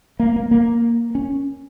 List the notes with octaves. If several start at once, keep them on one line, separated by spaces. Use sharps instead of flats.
A#3
A#3
A#3
C#4